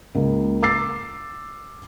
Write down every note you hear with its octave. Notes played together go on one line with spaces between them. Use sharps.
C#2 A#3
D6 E6 A6 C7